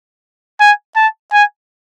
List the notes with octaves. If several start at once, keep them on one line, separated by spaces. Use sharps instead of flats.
G#5
A5
G#5